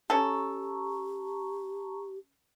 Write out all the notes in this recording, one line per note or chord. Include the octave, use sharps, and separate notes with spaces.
C#4 G4 A4 A5 A#5 C#6